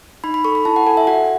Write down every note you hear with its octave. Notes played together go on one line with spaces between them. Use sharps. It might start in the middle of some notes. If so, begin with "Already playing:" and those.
D#4 B5
B5
A4 C#6
B5
E4 A5
F#5
A4 G#5
E5
F#4 F#5